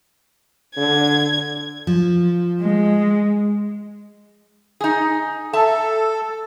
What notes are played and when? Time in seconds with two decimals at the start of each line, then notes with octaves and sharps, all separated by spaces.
0.77 D3 G#6
1.87 F3
2.61 G#3
4.81 D#4 G#4
5.53 A4 E5 A5